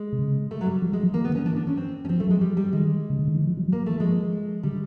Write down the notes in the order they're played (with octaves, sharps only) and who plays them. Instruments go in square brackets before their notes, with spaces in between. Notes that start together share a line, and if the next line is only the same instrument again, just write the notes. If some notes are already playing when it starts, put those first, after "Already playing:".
Already playing: [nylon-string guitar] G#3
[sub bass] C3
C#3
[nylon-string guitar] A3
F#3
G3
[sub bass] F3
[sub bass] F#3 [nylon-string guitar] G#3
[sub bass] F3
[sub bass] E3 [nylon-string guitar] A#3
[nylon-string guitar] B3
[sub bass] D#3
[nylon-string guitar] C#4
[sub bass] E3 [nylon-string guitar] D4
[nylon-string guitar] D4
C#4
C4
C#4
[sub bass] F3 [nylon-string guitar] C4
[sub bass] F#3 [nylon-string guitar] A3
[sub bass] F3 [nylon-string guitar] G#3
[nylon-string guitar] G3
G3
[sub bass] D#3 [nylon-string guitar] G#3
[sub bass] C#3
D3
D#3
E3
F3
F#3
F#3
[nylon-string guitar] A#3
[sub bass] E3 [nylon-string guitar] A3
[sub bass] F3 [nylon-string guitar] G#3
[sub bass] D3 [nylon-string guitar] G3